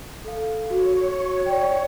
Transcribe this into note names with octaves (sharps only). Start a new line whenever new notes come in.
A4 F5
F#4 C#5
D5 G5